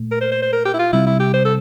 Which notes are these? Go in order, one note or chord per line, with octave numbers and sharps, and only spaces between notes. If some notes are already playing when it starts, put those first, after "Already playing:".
Already playing: A#2 A3
A#4
C5
C5
C5
A#4
G4
E4
F4
C3 G3 C4 E4
E4
G4
C5
A4